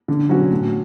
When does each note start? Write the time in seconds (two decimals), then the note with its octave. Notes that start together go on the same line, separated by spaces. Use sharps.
0.08 D3
0.29 F#3 C#4 F#4
0.51 A2